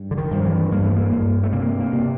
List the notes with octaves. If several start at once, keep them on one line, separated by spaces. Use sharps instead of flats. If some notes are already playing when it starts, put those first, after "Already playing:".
Already playing: G2
D3
D#3
G2 F3
E3
G2 A#3
A3
A#3
G2
A3
C3 A#3
A#3
C3